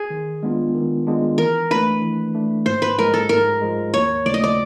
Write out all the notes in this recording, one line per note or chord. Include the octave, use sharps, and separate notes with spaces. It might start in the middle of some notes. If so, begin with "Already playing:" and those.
Already playing: G#4
D#3
G#3 B3 D4 F4
D#3
G#3 B3 D4 F4
E3 A#4
A3 D4 B4
E3
A3 D4
G#2 C5
B4
F3 G#3 A#4
A4
G#2 A#4
F3 G#3
D#2 C#5
C#3 F3 A3 D5
D#5
D5